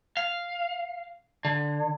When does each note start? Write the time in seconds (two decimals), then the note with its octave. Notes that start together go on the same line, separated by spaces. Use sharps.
0.17 F5
1.45 D3